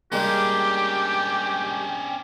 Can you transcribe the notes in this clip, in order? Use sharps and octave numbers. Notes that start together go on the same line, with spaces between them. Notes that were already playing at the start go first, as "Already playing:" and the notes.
G3 G#3 A#3 C#4 D4 G4 G5